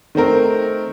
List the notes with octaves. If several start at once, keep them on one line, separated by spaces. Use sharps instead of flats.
D#3 A3 C4 A#4